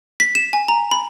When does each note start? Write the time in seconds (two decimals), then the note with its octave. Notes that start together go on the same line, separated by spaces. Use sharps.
0.20 B6
0.35 E7
0.53 G#5
0.68 A#5
0.91 B5